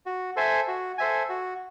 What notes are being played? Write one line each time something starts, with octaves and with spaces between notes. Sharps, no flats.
F#4
A4 C5 E5 G#5
F#4
A4 C5 E5 G#5
F#4